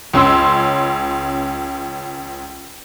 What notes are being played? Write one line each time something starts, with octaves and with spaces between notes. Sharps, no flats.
C#2 C#4 C6 E6